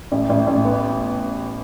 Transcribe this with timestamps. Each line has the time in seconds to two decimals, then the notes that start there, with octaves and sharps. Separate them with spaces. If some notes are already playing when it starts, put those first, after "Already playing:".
0.12 A1
0.30 A1
0.47 A1
0.65 B3